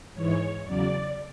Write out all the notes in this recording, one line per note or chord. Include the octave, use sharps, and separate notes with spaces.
G#2 E3 G#3 C#5
E2 C#3 F#3 D5